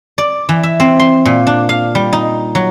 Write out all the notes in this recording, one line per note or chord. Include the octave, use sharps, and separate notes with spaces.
D5
E3
E5
C4
C6
A#2
D4
F5
G3
D#4
F#3